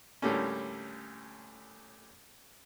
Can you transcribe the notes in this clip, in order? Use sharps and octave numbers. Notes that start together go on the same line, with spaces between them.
D2 A2 D3 G3 A#3 C#4